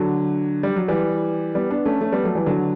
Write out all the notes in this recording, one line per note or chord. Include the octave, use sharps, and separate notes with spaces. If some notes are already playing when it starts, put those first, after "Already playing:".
Already playing: D3 F#3
G3
F#3
E3 G3
G3 B3
B3 D4
A3 C#4
A3 C#4
G3 B3
F#3 A3
E3 G3
D3 F#3